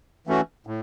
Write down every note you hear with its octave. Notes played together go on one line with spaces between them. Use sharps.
E3 A3 C#4 F#4
A2